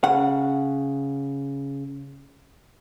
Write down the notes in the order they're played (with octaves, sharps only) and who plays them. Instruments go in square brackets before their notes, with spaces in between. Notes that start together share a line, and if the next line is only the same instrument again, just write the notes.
[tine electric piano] C#3 [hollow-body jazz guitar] F#5